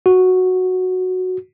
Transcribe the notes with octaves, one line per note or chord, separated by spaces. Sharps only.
F#4